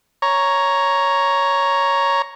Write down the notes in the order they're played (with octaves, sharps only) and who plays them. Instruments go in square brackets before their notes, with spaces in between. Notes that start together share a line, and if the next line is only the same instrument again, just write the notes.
[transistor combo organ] C#5 A#5